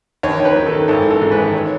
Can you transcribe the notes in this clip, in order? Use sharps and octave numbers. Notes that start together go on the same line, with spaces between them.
D#2 C#5
D#2 B4
D#3
A4
D#3
G#1 A4
E3
A4
G#2
B4
G#1
C#5